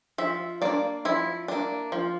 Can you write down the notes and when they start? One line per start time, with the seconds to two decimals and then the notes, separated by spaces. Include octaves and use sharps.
0.18 F3 E5
0.62 A#3 D4 D5
1.05 F3 E4
1.48 A#3 D4
1.92 F3